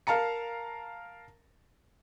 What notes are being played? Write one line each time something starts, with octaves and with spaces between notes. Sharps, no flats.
A#4 F5 A5 A#5 C#7